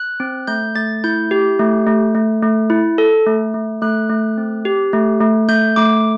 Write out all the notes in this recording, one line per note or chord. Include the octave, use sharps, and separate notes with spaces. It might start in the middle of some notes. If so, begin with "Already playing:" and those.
Already playing: F#6
C4
A3 G6
A3 A6
E4 G6
G4
A3
A3
A3
A3
E4
A4
A3
A3
A3 F#6
A3
C4
G4
A3
A3
A3 G6
A3 D6